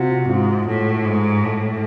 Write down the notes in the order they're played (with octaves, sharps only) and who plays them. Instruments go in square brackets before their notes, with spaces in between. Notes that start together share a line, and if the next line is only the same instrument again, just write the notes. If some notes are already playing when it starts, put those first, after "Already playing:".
Already playing: [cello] C3 [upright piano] F4 F#4
[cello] G#2 [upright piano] F4
[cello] A2
G#2
A2